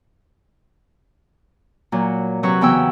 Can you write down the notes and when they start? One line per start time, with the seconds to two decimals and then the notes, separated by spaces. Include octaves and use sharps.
1.92 A#2 F#3
2.43 C3 F#3 C4 B4 C#5 C#6
2.61 E2 C#3 E3 B3 G5 E6